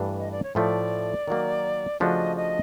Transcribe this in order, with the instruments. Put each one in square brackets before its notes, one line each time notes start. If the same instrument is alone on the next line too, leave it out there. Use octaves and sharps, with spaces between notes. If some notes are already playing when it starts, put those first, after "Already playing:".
Already playing: [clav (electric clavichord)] G2 E3 A3 D4
[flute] D#5
D5
C#5
[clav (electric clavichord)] A2 F3 A3 [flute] D5
[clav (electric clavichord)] D#3 F#3 A#3
[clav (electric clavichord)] C#3 F3 A3 D4 F#4 [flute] D#5
[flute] D#5